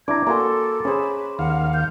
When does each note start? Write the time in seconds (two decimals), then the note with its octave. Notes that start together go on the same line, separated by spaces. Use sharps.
0.08 D4 E4 A#5 D6 G#6
0.27 A#3 F#4 A4 G#5 A#5 C6
0.85 C#4 G#4 C5 E5 G#5 B5
1.39 D#2 F5 F#5
1.74 G6